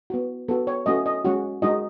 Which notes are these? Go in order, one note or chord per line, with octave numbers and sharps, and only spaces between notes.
B3 F#4
B3 F#4 A4
C#5
A3 C#4 F#4 D#5
D#5
G#3 C#4 F#4
G#3 D#4 F#4 D#5